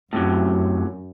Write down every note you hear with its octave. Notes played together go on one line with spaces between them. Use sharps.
F#2 A2 C3 F#3